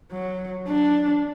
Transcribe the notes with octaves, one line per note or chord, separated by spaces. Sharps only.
F#3
D4